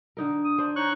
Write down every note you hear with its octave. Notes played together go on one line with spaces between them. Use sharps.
D3 D#4 A#4
D#6
D4 C5
D#4 C#5 C#6 F#6